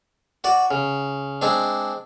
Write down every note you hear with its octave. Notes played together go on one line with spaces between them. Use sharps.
F#4 D5
C#3
G#3 C4 D4